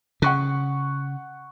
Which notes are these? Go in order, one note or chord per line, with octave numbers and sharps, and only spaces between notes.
C#3 F#5 C#6 F#6